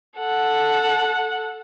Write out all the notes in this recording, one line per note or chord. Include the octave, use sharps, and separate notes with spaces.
A4 F#5